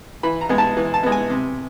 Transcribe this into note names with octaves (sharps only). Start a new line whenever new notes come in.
E3 B5
A#5
G#3 B3
A5
E3
A5
G#3 B3
G#5
C3